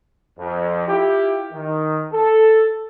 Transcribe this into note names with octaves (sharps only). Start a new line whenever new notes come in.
F2
E4 F4 G4
D#3
A4